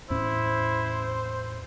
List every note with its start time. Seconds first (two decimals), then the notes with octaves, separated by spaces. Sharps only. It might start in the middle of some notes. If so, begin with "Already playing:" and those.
0.10 E2 A2 C#4 E4 C5